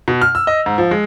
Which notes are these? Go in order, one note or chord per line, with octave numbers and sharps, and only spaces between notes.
B2
F6
E6
D#5
G#2
F3
G#3